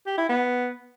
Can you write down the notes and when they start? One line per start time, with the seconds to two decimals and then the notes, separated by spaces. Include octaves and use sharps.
0.06 G4
0.18 E4
0.29 B3